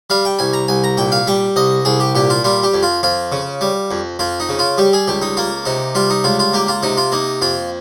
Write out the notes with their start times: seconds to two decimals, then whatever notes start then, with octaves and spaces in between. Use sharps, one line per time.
0.10 G3 F5
0.25 G5
0.39 C2 G#5
0.53 A#5
0.68 C2 G#5
0.84 A#5
0.97 A#2 G5
1.12 F5
1.27 G3 G5
1.56 C2 D#5
1.85 C2 G#4
2.00 G4
2.15 A#2 G4
2.30 F4
2.44 G3 F4
2.63 G4
2.74 F2
2.83 F4
3.03 F2 F4
3.32 C#3
3.61 G3
3.91 F2
4.19 F2 F4
4.40 D#4
4.49 C#3
4.59 F4
4.78 G3 G4
4.93 G#4
5.08 C#2 G4
5.22 D#4
5.37 A#3 F4
5.65 C3 D#4
5.95 G3 F4
6.10 D#4
6.24 C#2 F4
6.39 F4
6.53 A#3 G4
6.68 F4
6.83 C3 D#4
6.97 F4
7.12 A#3 D#4
7.42 F2 F4